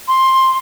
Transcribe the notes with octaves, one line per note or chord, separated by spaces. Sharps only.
C6